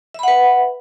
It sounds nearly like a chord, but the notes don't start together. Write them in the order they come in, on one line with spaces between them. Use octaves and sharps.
E5 B5 F#5 B4